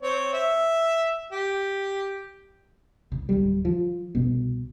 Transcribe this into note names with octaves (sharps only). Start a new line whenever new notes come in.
C4 C#5
E5
G4
C2
D1 G3
F3
C2 B2